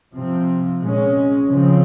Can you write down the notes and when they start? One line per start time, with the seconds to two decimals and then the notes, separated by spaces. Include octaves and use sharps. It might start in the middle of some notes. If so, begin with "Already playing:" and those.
0.15 C3 F3 C4
0.82 A#2 G#3 C#4
1.49 C#3 F3 C4